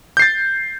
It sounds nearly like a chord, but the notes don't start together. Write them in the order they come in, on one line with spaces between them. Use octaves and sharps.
G6 C7 A6